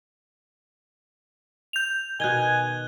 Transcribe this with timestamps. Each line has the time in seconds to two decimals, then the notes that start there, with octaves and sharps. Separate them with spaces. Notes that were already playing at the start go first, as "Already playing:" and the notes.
1.73 G6 F7
2.20 B2 D#3 G#5 F#6 G#6 G7